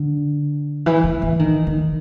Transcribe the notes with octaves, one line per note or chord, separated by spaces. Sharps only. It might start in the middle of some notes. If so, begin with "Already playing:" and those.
Already playing: D3
E3
E3
E3
D#3
D#3